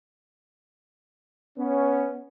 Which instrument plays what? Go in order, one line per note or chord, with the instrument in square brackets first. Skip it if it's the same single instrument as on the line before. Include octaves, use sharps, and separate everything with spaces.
[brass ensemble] B3 C#4